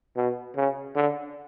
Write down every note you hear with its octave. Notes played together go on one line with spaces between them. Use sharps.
B2
C#3
D3